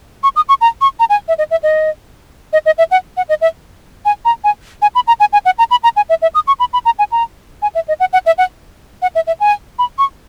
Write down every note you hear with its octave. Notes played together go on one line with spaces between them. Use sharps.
C#6
D#6
C#6
A#5
C#6
A#5
G#5
E5
D#5
E5
D#5
D#5
D#5
E5
F#5
F#5
D#5
E5
G#5
A#5
G#5
G#5
B5
A#5
G#5
G#5
F#5
A#5
B5
A#5
G#5
E5
E5
D#6
C#6
B5
B5
A#5
G#5
A#5
G#5
E5
D#5
F#5
F#5
E5
F#5
F#5
E5
E5
G#5
B5
C#6